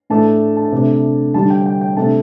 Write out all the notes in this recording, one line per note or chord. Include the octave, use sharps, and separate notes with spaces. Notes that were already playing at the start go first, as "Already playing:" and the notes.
A2 A3 D4 A5
A5
C3 A3 D4
D3 G3 D4 A5
G5
G5
G5
C3 A3 D4 A5